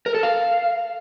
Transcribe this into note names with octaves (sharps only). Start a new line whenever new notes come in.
A#4
A4
F5